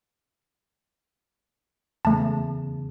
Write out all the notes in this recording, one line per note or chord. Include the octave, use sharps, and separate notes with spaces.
E2 C#3 A3 A5